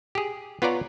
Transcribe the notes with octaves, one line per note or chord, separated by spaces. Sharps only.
G4 G#4
B3 F4 B4 C#5 D5 A#5